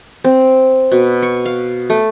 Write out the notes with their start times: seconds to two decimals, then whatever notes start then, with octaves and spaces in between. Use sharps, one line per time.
0.24 C4
0.92 B2
1.23 C#6
1.45 F5
1.90 A3